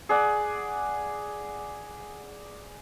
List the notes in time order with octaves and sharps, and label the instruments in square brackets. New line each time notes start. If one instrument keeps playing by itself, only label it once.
[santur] G#4 D5 F#5